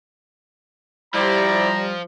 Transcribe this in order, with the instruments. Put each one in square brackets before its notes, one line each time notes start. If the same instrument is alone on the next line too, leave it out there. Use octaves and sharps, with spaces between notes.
[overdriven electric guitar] F3 [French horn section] G3 [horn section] E4 C5 D5 [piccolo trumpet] A#5